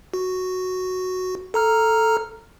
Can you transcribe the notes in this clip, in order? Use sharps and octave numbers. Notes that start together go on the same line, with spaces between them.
F#4
A4 A#5 F6